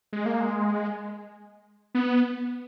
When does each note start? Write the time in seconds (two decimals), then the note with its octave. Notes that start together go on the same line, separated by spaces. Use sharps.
0.13 G#3
0.26 A#3
0.41 G#3
1.94 B3